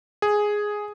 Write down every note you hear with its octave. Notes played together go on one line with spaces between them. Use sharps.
G#4